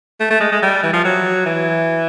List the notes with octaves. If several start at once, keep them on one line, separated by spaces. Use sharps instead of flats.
A3
A3
G#3
G#3
G3
E3
F3
F#3
E3